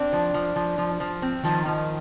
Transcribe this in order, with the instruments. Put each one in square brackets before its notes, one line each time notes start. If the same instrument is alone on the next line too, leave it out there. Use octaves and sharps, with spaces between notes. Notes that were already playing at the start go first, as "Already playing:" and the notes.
Already playing: [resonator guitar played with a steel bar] C4 [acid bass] D4
[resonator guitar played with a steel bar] F3
F3
F3
F3
F3
C4
[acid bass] D#3 [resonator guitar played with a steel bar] F3
[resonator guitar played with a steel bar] F3